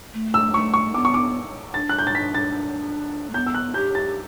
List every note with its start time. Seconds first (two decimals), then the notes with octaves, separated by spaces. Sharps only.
0.14 A3
0.34 E6
0.54 A3 C#6
0.74 C#6
0.94 B3 D6
1.05 C#6
1.14 D6
1.74 D4 A6
1.89 F#6
1.99 G6
2.07 A6
2.15 B6
2.34 A6
3.30 A3
3.34 B3 G6
3.46 E6
3.54 F#6
3.74 G4 G6
3.95 A6